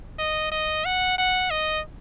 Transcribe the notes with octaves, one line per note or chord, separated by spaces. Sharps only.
D#5
D#5
F#5
F#5
D#5